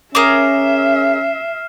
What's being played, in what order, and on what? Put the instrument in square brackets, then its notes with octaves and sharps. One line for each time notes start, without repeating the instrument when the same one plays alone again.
[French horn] C#4 [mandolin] G#4 A#4 D6 [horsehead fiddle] E5 [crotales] F6 C7 E7